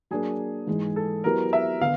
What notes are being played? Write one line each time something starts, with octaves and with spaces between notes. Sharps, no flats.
F#3 A#3 D4 F#4 G#4 A#4
G#2 E3 G#3
A4
F#3 B3 E4 G4 A#4 B4
E5
D3 B3 F5